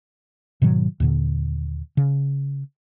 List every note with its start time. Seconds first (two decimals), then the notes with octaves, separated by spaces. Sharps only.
0.62 G#2 B2 D#3 F#3
1.00 D#2 A#2 D3
1.97 C#3